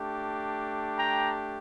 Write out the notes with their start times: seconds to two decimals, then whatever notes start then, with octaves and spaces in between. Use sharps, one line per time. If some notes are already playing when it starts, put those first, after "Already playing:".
Already playing: A3 D4 G4
0.98 G5 A#5